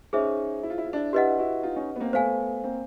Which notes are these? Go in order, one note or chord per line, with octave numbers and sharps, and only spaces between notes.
C#4 D#4 G#4 C5 E5
E4
F4
E4
F4
D4 E4
D4 E4 G4 B4 D#5 F#5
E4 F#4
D#4 F4
C#4 D#4
B3
A#3 C4
A3 B3 C5 F5 G#5
A#3 C4